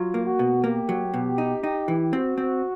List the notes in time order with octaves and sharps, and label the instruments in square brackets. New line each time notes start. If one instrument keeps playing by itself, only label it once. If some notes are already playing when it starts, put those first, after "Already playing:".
Already playing: [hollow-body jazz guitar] F#3 [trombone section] F4
[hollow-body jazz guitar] A#3
[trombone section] F#4
[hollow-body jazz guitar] B2
[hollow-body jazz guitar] A#3 [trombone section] G4
[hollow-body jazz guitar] F#3
B2
D#4
D#4
E3
[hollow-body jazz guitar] C4 [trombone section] F#4
[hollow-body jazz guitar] C4